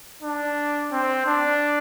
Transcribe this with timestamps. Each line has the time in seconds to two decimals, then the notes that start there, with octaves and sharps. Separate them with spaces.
0.22 D4
0.92 C4
1.27 D4